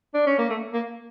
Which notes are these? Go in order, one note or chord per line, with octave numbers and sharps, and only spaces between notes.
D4
C#4
A#3
A3
A#3